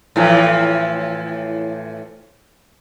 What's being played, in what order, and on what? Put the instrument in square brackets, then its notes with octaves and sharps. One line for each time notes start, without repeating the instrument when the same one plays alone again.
[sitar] A2 E3 F3